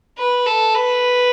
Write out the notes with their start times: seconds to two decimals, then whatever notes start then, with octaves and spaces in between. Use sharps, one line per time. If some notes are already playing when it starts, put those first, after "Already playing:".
0.18 B4
0.47 A4
0.75 B4